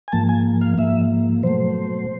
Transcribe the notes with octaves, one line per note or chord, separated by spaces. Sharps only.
G#5
G#2 F3 A#3 A5
G#5
F5
G#2 F3 A#3 E5
B2 F#3 A3 C5